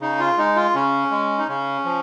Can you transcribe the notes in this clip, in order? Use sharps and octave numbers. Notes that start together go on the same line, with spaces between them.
C#3 D#4
F4
G#3 D#4
F4
C#3 C#4
G#3
D#4
C#3 C#4
F3